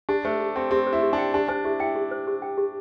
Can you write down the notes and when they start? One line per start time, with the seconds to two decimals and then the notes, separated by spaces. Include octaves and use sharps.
0.09 D4 G4
0.25 A3 C5
0.40 G4
0.56 C4 G5
0.71 C4 G4
0.87 C5
0.93 E4
1.02 G4
1.13 D4 G5
1.34 D4 G4
1.48 D4 C5
1.64 E4 G4
1.80 E4 G5
1.96 G4
2.11 C5
2.27 G4
2.42 G5
2.58 G4